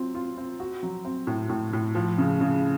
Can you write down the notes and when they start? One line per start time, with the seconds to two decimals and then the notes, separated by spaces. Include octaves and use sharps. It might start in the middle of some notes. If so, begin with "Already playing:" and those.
Already playing: F#3 C4 F4
0.15 F4
0.38 C4
0.60 F#4
0.83 F#3
1.05 C4
1.27 A2
1.49 A2
1.73 A2
1.95 F3
2.18 C#3
2.41 C#3